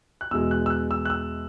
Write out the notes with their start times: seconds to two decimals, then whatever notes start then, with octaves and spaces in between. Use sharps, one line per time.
0.21 F#6
0.31 E2 B2 G#3 E6
0.51 F#6
0.66 E6
0.70 F#6
0.91 E6
1.05 F#6
1.10 E6